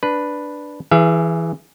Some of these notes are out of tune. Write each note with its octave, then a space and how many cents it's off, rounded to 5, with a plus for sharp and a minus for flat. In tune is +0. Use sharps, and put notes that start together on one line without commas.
D4 +0 B4 +0
E3 +0 G#4 +0 E5 +45